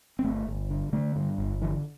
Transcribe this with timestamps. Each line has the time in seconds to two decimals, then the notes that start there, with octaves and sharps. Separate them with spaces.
0.19 C4
0.24 G1 A3
0.47 G1
0.70 D3
0.93 D3 A3
1.16 G2
1.38 G1
1.61 D3 E3